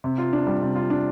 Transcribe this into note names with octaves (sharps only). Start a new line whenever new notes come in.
C3
F4
D4
G3
C3
F4
D4